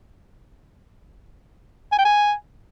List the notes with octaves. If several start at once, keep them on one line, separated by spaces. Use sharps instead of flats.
G#5
G5
G#5